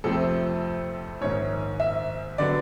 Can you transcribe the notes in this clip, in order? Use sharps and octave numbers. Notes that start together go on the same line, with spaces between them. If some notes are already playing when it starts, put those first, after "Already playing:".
F2 C3 F3 A3 C4 A4
A#1 G#2 D#3 C#5
E5
D3 F#3 B3 D5